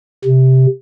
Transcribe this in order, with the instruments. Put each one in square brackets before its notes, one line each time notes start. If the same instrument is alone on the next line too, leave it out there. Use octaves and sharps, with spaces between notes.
[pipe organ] C3